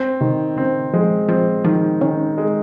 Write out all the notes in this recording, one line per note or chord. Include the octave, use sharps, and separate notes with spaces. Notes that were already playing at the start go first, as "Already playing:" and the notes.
Already playing: C4
C3 D#3
C#3 C4
F3 G#3
F3 C4
D#3 F3
D#3 C#4
G#3